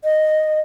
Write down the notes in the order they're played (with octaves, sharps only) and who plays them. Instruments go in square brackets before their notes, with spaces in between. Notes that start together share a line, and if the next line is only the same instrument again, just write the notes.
[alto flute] D#5